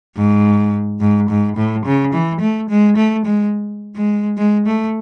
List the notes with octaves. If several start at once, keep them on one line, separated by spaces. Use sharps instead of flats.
G#2
G#2
G#2
A2
C#3
E3
A3
G#3
A3
G#3
G#3
G#3
A3